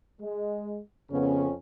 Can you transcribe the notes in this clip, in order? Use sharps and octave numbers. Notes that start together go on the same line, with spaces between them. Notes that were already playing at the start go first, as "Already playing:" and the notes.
G#3
F2 C#3 B3 C#4